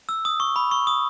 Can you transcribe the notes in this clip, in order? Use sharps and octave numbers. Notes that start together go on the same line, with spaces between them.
E6
D#6
C#6
B5
C#6
D#6